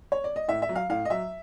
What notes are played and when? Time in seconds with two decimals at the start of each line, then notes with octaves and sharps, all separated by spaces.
0.12 C#5
0.24 D5
0.36 D#5
0.48 A2 E5
0.62 E5
0.69 F#3
0.76 F5
0.90 A2 F5
1.05 D#5
1.10 F#3 E5